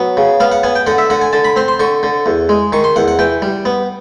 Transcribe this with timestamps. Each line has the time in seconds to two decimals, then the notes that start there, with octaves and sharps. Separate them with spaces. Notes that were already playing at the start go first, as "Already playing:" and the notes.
Already playing: F#3 B3
0.17 C#3
0.40 B3 F5
0.52 F#5
0.63 B3 G#5
0.75 G5
0.87 D3 F#5
0.98 E5
1.10 D3 F#5
1.21 G#5
1.33 D3 A5
1.45 B5
1.56 C4 C6
1.68 C6
1.80 D3 C#6
2.03 D3
2.26 E2
2.49 G#3
2.72 D#3 C#6
2.84 C6
2.96 E2 F#5
3.08 F#5
3.19 E3 G5
3.42 G3
3.65 B3